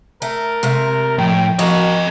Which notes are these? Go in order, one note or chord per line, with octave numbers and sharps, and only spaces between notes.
A3 A#4
C3 G#3 A3
A2 F3 G5
F3 A#3 F#4 A4 D#5